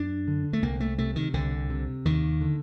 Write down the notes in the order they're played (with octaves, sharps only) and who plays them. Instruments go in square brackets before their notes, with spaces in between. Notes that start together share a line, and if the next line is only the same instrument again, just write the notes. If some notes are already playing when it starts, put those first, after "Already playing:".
Already playing: [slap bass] F#2 D4
D3
A3
C2 A#3
A3
C3 A3
D#3
C2 D3
C3
D#2 D#3
D3